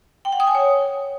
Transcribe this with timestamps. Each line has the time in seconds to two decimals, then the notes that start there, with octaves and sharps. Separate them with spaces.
0.25 G5
0.32 F#5
0.40 D#6
0.47 G#5
0.55 C#5